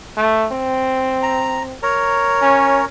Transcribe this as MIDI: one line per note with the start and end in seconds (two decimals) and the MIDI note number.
0.17 0.47 57
0.52 1.76 60
1.23 1.63 82
1.83 2.85 70
1.83 2.85 73
1.83 2.85 82
2.42 2.83 61